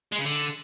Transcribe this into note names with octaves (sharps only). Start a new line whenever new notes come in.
G#3
C#3
D3